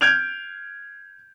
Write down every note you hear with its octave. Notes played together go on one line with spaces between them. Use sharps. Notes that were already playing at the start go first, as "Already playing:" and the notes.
F6 G6 G#6 D7 F7